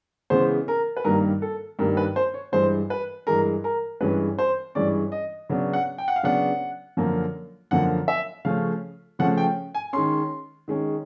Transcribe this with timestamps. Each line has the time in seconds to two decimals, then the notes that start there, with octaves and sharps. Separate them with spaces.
0.30 C#3 E3 G#3 B3 C5
0.68 A#4
0.97 B4
1.04 G2 D#3 G3 A#3 A#4
1.42 A4
1.79 G2 D#3 G3 A#3 A#4
1.97 B4
2.16 C5
2.34 C#5
2.52 G2 E3 G#3 C5
2.90 B4
3.27 G2 E3 G#3 A#4
3.64 A#4
4.01 G2 E3 G#3 C#4 B4
4.39 C5
4.75 G2 E3 G#3 C#4 D5
5.12 D#5
5.49 C#3 F#3 B3 D4
5.73 F#5
5.98 G5
6.08 F#5
6.16 F5
6.23 C#3 F#3 B3 D4 F#5
6.97 F#2 D3 F3 A#3
7.71 F#2 D3 F3 A#3 F#5
8.08 E5
8.45 C#3 F3 A3 C#4 F5
9.19 C#3 F3 A3 C#4 F#5
9.38 G5
9.75 G#5
9.93 D#3 G#3 C#4 C6
10.68 D#3 G#3 C#4